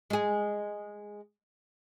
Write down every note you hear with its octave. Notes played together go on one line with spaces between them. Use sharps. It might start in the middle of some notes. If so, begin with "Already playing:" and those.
G#3 G#4